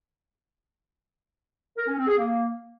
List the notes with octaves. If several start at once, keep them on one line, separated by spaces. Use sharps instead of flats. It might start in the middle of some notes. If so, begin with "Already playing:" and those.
A#4
C#4
C4
G#4
A#3